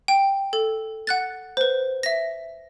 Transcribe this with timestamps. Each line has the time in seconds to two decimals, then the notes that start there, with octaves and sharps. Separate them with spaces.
0.08 G5
0.53 A4
1.07 F#5 F#6 A6
1.57 B4 C5
2.03 E5 A#6